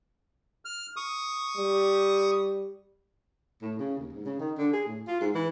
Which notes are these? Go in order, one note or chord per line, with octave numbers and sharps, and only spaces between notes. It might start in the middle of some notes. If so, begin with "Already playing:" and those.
F6
C#6 D#6
G3
A2
C#3
D#2
G#2
C#3
D#3
D3
G#4
A2
F4
G#2
E3